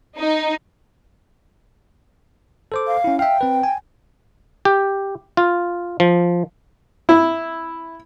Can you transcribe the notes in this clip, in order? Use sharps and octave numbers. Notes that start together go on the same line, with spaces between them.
D#4
A4 C5 D6
F5
C#4 E4
E5 F5 G5
C4 B4
G#5
G4
F4
F3
E4